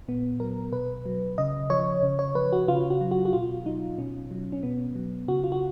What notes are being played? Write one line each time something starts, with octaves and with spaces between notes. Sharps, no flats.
A#2 B3
F#3 A#4
B2 B4
F#3
C#3 D#5
F3 C#5
C#3
C#5
F3 B4
F#4
C#3 F4
F#4
F#3
F#4
F#4
B2 F4
F#3 D#4
B2 C#4
F#3
C#4
B2 B3
F#3
C#3 F#4
F4
F#4